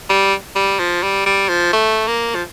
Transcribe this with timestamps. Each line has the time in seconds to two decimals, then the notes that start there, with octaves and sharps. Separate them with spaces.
0.09 G3
0.56 G3
0.79 F3
1.03 G3
1.26 G3
1.49 F3
1.73 A3
2.07 A#3
2.35 F3